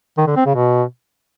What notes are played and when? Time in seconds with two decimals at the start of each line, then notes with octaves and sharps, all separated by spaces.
0.18 D#3
0.27 D3
0.36 C4
0.46 C#3
0.55 B2